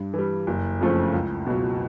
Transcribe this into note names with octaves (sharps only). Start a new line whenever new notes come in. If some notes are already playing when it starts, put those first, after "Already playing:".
Already playing: G2
E3 G3
F#1
F2 C#3 F3 A3
C#2
B2 F#3